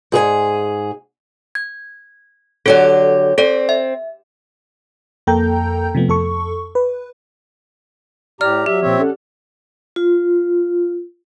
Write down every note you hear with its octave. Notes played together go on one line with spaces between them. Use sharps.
G#2 G#4 B4 G#5
G#6
D3 F#3 G4 A4 D5
C4 A4 D5
E5
F2 A#3 A4 G5 A#5 G6
C3 F3 A3 B3
F2 A4 C#6
B4
A2 G4 D5 A#5 F6
F#3 G4 E5
A#2 F3 C4 C#5 E5
C#4 A4 F#5
F4